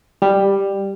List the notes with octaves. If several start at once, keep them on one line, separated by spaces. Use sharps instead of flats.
G3